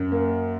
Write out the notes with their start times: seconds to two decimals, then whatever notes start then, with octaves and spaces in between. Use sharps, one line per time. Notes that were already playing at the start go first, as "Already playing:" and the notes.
Already playing: F#2
0.12 A#3